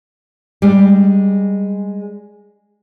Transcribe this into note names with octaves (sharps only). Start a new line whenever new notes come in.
G3 G#3 D4